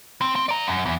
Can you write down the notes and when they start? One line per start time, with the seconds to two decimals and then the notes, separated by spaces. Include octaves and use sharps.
0.21 C4
0.36 C4
0.49 D5 A#5
0.67 F#2
0.86 E2